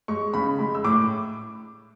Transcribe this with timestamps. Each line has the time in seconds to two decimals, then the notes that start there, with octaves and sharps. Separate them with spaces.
0.08 G#3 C#6
0.34 C#3 B5
0.59 G#3 B5
0.75 E6
0.84 A2 D6